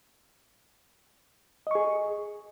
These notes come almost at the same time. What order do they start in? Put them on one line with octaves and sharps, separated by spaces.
D#5 C#6 G#4